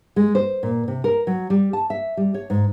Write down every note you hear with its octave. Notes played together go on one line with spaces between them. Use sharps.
G#3
C5
A#2
C3
A#4
F#3
G3
A5
E5
G3
C#5
G#2